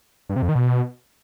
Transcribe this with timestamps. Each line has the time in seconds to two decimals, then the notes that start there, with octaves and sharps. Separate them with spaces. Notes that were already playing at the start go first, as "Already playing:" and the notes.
0.29 G2
0.36 C3
0.42 F2
0.49 D#3
0.55 B2